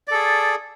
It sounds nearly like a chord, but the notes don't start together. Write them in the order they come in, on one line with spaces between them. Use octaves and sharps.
D5 A4 G#4